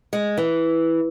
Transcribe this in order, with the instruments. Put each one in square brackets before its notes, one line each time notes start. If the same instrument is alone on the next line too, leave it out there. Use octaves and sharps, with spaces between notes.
[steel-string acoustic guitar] G#3
E3